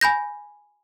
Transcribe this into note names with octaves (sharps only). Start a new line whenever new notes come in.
G#5 B5 G6 A#6